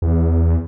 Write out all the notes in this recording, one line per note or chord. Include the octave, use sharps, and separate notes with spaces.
E2